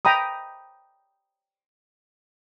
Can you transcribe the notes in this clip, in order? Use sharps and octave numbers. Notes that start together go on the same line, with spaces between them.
G5 A#5 B5 D#6